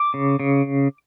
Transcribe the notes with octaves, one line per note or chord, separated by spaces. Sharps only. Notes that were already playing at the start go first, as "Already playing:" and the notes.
Already playing: D6
C#3
C#3